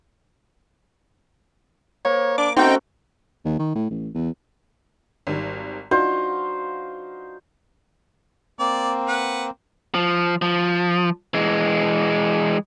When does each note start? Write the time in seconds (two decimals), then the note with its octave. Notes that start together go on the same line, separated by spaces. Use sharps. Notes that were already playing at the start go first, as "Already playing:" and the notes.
2.05 A#3 C5 C#5
2.38 D4 D6
2.57 A3 C4 C#4 D#4 F#4 C5 G5 A#5
3.45 D#2
3.59 D#3
3.75 A2
3.90 A1
4.15 E2
5.27 G#1 D#3 G3
5.91 D4 D#4 F4 F#4 C5
8.59 A#3 C4 D5
9.08 B4 F#5
9.94 F3
10.42 F3
11.34 E3 G#3